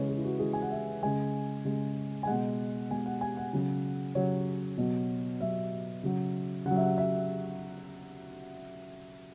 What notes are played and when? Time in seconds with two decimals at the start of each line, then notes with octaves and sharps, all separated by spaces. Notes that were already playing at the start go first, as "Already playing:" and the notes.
Already playing: C#3 E3 G#3 B4 C#5
0.09 G#4
0.17 E4
0.25 F#4
0.39 C#3 E3 G#3 G#4
0.53 G#5
0.62 F#5
0.70 E5
1.02 C#3 G#3 G#5
1.65 C#3 G#3
2.23 G#5
2.27 B2 G#3 F#5
2.90 B2 G#3 G#5
3.06 F#5
3.21 G#5
3.37 F#5
3.53 C#3 F#3
4.15 C#3 F#3 C#5
4.78 B2 F#3
5.41 B2 F#3 E5
6.03 C#3 F#3
6.65 C#3 F#3 F#5
6.76 E5
6.81 F#5
6.98 E5